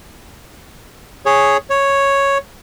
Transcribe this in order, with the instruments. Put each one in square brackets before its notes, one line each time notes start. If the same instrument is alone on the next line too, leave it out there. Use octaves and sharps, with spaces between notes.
[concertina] G#4 C#5
C#5